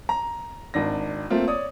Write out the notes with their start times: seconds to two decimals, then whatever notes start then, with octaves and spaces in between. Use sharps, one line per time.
0.09 A#5
0.74 G#1 D4 A#6
1.30 A3 A#3 C4 F4
1.48 C#5 D5 D#6